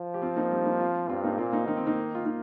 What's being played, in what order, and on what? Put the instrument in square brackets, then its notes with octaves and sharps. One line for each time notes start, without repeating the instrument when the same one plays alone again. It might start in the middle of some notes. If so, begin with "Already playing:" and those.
Already playing: [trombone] F3
[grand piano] G4
C4 F4
A#3 D#4
G3 C4
A#3 D#4
C4 F4
[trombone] G2 [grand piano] C4 F4
[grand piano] A#3 D#4
[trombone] A#2 [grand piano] C4 F4
[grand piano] A#3 D#4
[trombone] D#3 [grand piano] D#4
[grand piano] C4
A#3 D#4
F4
A#3 D#4